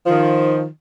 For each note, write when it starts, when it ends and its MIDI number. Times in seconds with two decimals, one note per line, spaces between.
0.06 0.65 51
0.06 0.65 53